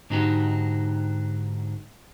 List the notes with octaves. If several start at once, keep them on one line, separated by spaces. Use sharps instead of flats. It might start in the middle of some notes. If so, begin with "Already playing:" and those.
G#2 D3 D#4 F#4 G4